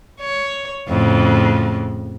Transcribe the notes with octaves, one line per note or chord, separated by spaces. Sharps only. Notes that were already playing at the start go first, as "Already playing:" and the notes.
C#5
F2 A2 C#3